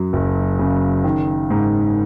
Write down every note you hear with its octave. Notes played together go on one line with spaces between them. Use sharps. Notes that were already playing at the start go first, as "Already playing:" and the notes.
Already playing: F#2 F#3
F#1
C#3
D#3
G#2